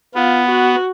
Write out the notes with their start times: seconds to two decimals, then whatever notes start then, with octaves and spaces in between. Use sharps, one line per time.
0.15 B3 F4
0.49 F#4